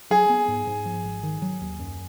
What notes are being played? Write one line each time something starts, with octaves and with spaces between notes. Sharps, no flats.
F#3 G#4
B3
G#2
G#2
F3
G#1
D#3
F#3
D#2
F#2